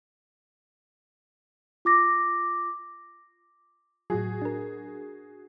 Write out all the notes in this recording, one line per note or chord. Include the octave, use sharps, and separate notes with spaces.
F4 D6 A#6
A2 F#3 F#4 G#4
D4 A#4